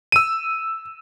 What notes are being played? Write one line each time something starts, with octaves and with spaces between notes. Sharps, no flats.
E6 D#7